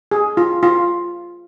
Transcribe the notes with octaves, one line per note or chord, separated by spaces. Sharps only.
G#4
F4
F4